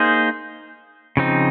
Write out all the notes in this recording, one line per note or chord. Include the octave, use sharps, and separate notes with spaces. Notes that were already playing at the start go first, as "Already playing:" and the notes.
Already playing: A#3 D#4 G#4 C5
C#3 F3 C4 D#4